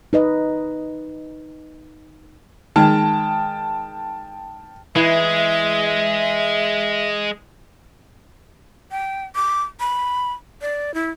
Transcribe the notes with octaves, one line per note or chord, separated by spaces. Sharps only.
D#4 B4 D#5
D#3 G#3 G5 A5 F6
E3 G#3 E5
G5
D6
B5
D5
E4